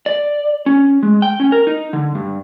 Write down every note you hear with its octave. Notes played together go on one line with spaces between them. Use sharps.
D5
C#4
G#3
G5
C#4
A#4
D#4
D3
G2